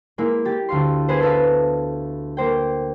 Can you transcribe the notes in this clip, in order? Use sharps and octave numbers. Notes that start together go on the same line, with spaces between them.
G#3 A#3 E4
G4 A6
D2 F5 C6
B3 G#4 B4 C5
A4 B4 E5 F5
A#3 C5 G5